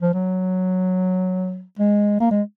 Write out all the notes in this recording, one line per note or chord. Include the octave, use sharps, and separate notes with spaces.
F3
F#3
G#3
A#3
G#3